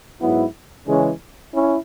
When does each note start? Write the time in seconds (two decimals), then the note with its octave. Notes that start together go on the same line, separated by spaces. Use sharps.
0.22 G#2 F#3 B3 E4
0.87 C#3 E3 G#3 C#4
1.54 C#4 E4